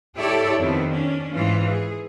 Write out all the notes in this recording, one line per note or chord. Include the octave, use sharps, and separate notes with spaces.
E4 G4 A4 C#5 D5
F2 D#3 B3 C4
C#4 D4
G#2 E3 F4
G#4